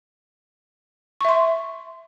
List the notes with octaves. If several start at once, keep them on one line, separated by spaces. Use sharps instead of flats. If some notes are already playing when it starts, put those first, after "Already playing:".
E5 C6 C#6